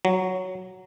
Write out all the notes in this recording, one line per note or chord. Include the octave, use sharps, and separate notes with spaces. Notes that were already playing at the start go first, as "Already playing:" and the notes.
F#3